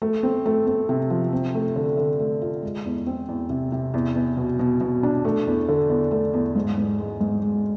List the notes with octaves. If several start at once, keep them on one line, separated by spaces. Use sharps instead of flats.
A3
C4
A3
C4
C3
F3
C4
A3
D3
D3
A3
F4
G#3
E2
C4
E2
C3
C3
E2
E2
B2
B2
B2
D4
A3
E2
D3
E2
A3
E2
G#2
G#2
G#3
G#2
G#3